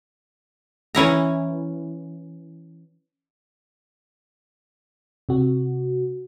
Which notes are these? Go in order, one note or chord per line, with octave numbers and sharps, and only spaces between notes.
E3 C#4 E4 A#5
C3 F#4